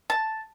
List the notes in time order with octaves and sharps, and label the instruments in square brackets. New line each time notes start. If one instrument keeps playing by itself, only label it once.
[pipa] A5